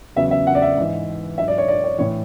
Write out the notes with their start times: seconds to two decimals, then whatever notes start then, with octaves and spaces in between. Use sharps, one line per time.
0.16 E2 C#3 F#3 E5
0.31 E5
0.47 F#5
0.55 D5
0.62 E5
0.77 G#2 E3
1.38 G#2 F#3 E5
1.48 D5
1.58 C#5
1.68 D5
1.84 C#5
1.98 A2 E3 C#5